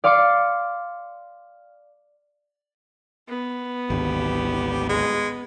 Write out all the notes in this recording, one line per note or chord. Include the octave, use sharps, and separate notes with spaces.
D5 F5 C6 D6 C#7 D7
B3
G#1 D2 G3
G#3